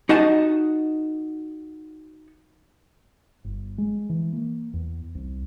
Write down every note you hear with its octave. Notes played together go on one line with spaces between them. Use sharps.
D#4 F#4 D#5 A5
G1
G#3
E3
A#3
E2
C2